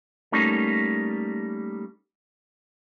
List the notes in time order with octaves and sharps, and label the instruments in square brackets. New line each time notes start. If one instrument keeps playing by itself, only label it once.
[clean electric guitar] G3 A3 A#3 C#4 D#4